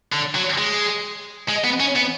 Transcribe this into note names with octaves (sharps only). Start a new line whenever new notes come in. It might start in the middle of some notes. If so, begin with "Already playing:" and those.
D3
F#3
G#3
G#3
B3
C#4
B3